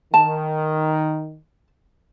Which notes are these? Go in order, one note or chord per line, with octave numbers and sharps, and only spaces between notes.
D#3 A5